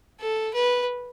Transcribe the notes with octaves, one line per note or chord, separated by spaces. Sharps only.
A4
B4